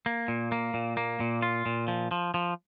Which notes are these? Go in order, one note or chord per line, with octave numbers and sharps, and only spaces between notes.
A#3
A#2
A#3
A#2
A#3
A#2
F4
A#2
F3
F3
F3